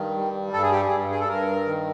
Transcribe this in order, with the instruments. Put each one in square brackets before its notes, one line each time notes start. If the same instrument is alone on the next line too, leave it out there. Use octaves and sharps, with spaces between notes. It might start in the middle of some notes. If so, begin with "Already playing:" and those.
Already playing: [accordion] G2 D#3
G3
G2 A4
G#4
G4
G#4
G2
G#4
A4
G2 A#4
D#3